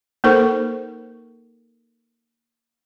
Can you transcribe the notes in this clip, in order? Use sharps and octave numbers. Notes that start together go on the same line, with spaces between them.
A#3 D#4 A4 A#4 C5 C#6